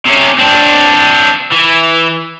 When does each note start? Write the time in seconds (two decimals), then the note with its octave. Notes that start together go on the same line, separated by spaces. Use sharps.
0.05 C3 C#4
0.39 C4 D4
1.52 E3